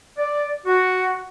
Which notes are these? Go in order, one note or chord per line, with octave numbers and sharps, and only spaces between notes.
D5
F#4